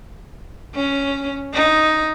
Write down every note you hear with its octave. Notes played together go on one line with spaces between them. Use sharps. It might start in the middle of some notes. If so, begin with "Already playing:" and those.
C#4
D#4